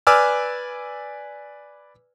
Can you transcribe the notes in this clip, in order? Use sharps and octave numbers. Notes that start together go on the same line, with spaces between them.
B4 D5 G#5 D6 E6 F6